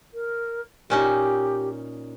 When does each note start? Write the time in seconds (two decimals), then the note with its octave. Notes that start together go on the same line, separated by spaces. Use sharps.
0.14 A#4
0.90 A#2 C#4 D#4 G4